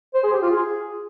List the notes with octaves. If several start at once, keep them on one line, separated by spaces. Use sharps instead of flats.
C5
G#4
G4
F4
G#4